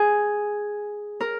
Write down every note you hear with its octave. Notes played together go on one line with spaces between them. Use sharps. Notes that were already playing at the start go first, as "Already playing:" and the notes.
Already playing: G#4
A#4